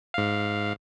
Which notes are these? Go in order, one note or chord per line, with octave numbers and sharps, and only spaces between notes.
G#2 F5